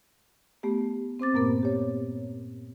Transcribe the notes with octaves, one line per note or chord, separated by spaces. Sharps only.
A3 B3 G4
C4 C5 D6 A6
G2 A#2 A#3 B3 A#4
G4 C#5